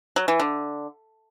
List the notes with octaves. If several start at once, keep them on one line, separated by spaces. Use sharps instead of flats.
F#3
E3
D3